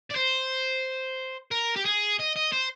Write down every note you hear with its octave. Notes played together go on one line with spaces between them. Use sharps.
D5
C5
A#4
G4
G#4
D#5
D#5
C5